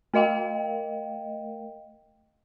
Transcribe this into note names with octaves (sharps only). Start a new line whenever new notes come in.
A3 A#4 D#5 F5 G5